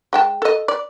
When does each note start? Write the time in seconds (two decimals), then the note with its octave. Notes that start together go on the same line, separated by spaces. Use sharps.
0.13 G#3 G5 A5
0.42 A4 D#5
0.68 D5